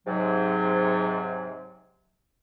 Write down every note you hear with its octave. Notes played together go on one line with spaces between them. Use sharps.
G#2 C3 F#3